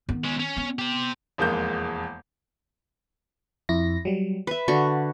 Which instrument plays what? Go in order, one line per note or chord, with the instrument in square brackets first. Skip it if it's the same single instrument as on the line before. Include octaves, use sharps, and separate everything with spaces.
[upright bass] D#3 B3
[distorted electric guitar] G#3 C#4
C#4
[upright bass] B3
[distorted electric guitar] G4 C5
[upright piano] E1 F2 G#3 A#3 G6
[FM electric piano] F2 E4 A#6
F#3 G3
[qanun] B4 E5 [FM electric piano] B5
[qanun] D3 F#4 C#6